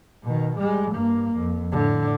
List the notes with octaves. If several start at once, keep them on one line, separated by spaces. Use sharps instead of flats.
B2 D#3
G3 G#3
G2 A#3
F2
A2 D3